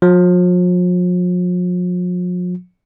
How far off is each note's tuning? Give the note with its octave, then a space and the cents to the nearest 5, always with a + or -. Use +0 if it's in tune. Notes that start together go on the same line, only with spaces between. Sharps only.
F3 +45